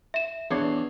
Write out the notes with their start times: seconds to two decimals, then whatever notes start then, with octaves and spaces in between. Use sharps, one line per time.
0.14 E5 E7
0.51 E2 D4 C#5